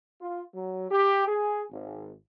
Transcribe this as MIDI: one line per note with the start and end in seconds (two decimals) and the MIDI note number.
0.20 0.41 65
0.53 0.89 54
0.90 1.25 67
1.27 1.63 68
1.71 2.12 32